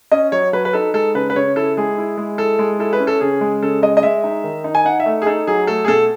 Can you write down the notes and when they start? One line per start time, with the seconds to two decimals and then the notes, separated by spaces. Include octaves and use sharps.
0.12 C#4 D#5
0.32 F#3 C#5
0.53 F#3 B4
0.65 B4
0.73 D#4 A4
0.94 G#3 A4
1.14 C#3 B4
1.30 B4
1.35 C#3 C#5
1.56 E4 A4
1.77 G#3 G#4
1.98 E4
2.17 G#3
2.38 E4 A4
2.59 G#3
2.79 E4 A4
2.93 B4
3.00 C#4
3.07 A4
3.21 C#3 G#4
3.41 G#3
3.62 C#3 A4
3.82 G#3 D#5
3.97 D#5
4.03 G#3 E5
4.24 D#4
4.44 D#3
4.64 D#4
4.75 G#5
4.85 D#4 F#5
5.00 E5
5.06 A3
5.22 G#4
5.26 D#4 A4
5.47 F#3 G#4
5.67 A3 A4
5.85 G#4
5.88 B2 A4